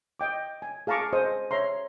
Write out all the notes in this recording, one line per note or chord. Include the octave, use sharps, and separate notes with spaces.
D#5 G5 D6
G#5
G#4 F5 A5 A#5 C#6 D6
G#4 C5 D#5 D#6
C#5 E5 A#5 C6